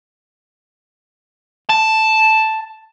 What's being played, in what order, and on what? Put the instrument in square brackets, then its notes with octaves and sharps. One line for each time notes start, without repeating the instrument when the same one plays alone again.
[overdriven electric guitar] A5